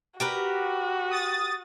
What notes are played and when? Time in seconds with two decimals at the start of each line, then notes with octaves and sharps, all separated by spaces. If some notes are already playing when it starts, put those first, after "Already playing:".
0.20 F#4 G4 A#4 B4
1.10 D#6 A6